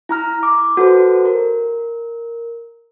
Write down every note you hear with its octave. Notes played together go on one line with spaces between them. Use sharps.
E4 A#5 F6
D6
F#4 A4 B4 C5
A#4